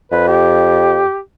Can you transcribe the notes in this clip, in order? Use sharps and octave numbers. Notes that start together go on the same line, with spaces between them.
F2 B4
G4